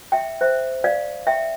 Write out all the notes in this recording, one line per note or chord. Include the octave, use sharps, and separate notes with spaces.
E5 G5
C5 E5
D5 F5
E5 G5